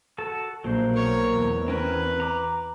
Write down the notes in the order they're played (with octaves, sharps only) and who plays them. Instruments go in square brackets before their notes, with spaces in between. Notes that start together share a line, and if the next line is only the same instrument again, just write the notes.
[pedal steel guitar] F#4 A4 A5
[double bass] A#1 [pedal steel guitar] F#3 A#3 C5
[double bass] B1 [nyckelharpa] A#4 C#5
[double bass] E2
[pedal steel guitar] C4 C#4 A#4 [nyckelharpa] B4
[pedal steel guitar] A#5 D6